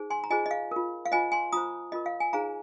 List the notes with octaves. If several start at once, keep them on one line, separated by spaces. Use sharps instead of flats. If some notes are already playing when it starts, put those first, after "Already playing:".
Already playing: D#4 G#4 C5
G#5 C6
A#5
F4 G#4 C5 D#5 G#5
D#5
F5
F4 A#4
F5
F4 C5 D#5 G#5
G#5 C6
F4 C5 A#5 D#6
F4 A#4 D#5
F5
G#5
D#4 G#4 C5 F5 A#5